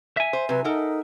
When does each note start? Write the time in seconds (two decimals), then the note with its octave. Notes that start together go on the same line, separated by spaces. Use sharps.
0.17 E5 G#5
0.33 C5
0.49 C3 F#3 B4
0.64 D#4 A4 A#4 F#5